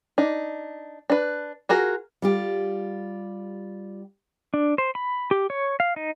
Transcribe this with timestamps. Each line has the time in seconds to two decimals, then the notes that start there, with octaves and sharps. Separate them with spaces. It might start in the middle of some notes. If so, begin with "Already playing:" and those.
0.18 D4 D#4
1.10 D4 B4
1.69 F4 F#4 G#4 A#4
2.22 G3 F4 G4
4.54 D4
4.78 C5
4.95 B5
5.31 G4
5.50 C#5
5.80 F5
5.96 D#4